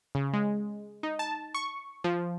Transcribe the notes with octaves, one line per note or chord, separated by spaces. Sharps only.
C#3
G#3
D#4
A5
C#6
F3